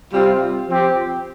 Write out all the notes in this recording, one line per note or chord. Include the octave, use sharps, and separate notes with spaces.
C3 G3 C4 F4
F3 C4 G4